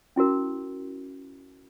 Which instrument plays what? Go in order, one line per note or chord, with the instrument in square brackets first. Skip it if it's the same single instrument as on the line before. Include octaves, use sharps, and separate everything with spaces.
[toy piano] C#4 E4 F#4 A#4